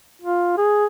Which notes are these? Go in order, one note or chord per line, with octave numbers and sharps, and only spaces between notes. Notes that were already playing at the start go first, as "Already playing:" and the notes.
F4
G#4